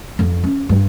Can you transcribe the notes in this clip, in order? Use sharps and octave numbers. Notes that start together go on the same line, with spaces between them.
F2
C#4
G2